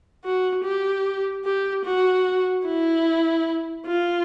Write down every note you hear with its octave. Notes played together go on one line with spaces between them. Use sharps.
F#4
G4
G4
F#4
E4
F4